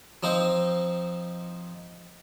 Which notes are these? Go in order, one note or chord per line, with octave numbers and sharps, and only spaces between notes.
F3 C4 D#4 C5